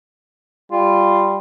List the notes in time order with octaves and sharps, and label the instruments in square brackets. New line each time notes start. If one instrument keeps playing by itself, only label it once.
[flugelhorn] G3 [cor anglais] F4